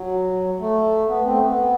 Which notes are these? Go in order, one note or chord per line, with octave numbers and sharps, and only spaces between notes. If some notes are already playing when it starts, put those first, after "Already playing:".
Already playing: F#3
A3
B3
C4
A3
B3